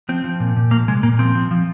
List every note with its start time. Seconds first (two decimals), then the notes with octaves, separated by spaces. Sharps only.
0.09 F3 C4
0.24 F3
0.40 A#2
0.57 A#2
0.71 F3 A#3
0.88 C3 G#3
1.03 A#2 A#3
1.19 F3 C4
1.35 F3
1.51 F3